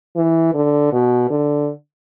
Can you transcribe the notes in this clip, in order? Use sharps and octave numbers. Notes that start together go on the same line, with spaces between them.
E3
D3
B2
D3